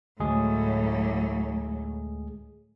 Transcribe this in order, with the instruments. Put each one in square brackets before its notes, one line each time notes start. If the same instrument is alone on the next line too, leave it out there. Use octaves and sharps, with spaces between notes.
[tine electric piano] D2 G#3 G#4 [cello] A2 F#3